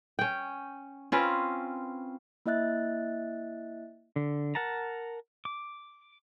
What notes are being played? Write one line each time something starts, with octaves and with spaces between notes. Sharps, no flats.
C#4 G5
C4 C#4 F4 B4
A#3 E4 D#5 E5 F#6 A6
D3
A#4 F#5 A5 A#5
D6